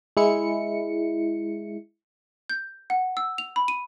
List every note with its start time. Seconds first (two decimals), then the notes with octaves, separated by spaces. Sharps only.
0.17 G#3 E4 C#7
2.49 G6
2.90 F#5
3.17 E6
3.38 F7
3.56 B5
3.68 D#7